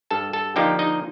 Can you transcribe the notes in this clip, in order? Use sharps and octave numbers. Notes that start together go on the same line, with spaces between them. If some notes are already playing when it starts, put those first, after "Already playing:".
G2 A4 A5
A4 A5
D3 F3 A#3 D#4 G4 G5
D#4 D#5